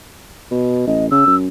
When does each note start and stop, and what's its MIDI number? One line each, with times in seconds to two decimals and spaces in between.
0.51 0.83 47
0.87 1.10 33
0.87 1.06 75
1.11 1.26 49
1.11 1.35 88
1.27 1.48 42